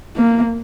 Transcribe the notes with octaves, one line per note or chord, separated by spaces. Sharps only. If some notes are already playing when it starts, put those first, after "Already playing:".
A#3